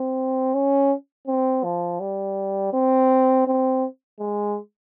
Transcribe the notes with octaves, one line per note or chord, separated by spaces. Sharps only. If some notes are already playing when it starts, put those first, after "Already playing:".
Already playing: C4
C#4
C4
F3
G3
C4
C4
G#3